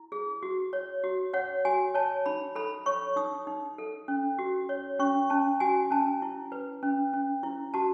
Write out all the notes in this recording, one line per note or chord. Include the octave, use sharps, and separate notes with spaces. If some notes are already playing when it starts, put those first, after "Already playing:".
Already playing: E4
G#4
F#4
C#5
F#4
C#5 F#5
F#4 G#5
C#5 A5
D#4 B5
A4 B5
C#5 C#6
D#4 D#6
D#4
A4
C#4
F#4
C#5
C#4 C#6
C#4 A5
F#4 G#5
C#4 A5
E4
B4
C#4
C#4
E4
F#4 A5